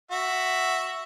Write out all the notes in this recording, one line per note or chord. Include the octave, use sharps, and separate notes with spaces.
F#4 E5